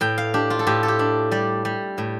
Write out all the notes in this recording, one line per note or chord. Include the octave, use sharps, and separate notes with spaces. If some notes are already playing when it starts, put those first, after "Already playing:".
A2 G5
F5
D4 G4
F4
A4
A2 G4
A4
G4
D4
G3 D5
G3
A2